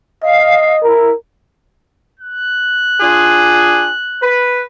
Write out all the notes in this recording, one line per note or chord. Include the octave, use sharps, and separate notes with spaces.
D#5 F5
E4 A#4
F#6
D4 F4 G#4
B4